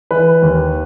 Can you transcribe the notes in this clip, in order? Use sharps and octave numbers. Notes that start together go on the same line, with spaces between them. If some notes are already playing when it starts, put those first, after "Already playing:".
E3 B4
D#2